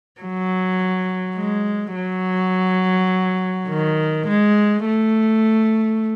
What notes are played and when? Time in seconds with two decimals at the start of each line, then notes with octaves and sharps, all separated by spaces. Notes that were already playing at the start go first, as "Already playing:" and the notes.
0.21 F#3
1.37 G#3
1.95 F#3
3.69 D#3
4.27 G#3
4.85 A3